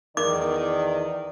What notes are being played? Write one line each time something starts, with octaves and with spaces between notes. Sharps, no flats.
E2 D#3 A#4 D5 D6